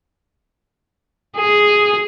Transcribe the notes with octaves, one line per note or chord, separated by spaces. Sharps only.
G#4